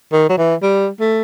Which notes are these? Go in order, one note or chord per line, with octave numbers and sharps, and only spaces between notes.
D#3
F#3
E3
G3
A3